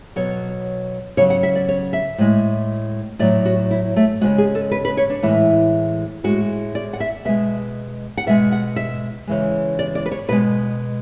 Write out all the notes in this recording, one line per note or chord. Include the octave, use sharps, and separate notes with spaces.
B2 F#3 C#5
C#3 F#3 C#5
F#5
E5
D5
C#5
E5
A2 G#3
A2 F#3 D5
F#4
E4
A3
C#3 E3 G#3 F#4
G#4
A4
B4
B4
C#5
D4
A2 E3 G#3 E4
A2 G#3 F#4
D5
F#5
E5
B2 G#3 E5
F#5
B2 G#3 E5
F#5
E5
C#3 E3 G#3
D5
D5
B4
C#5
B2 G#3 B4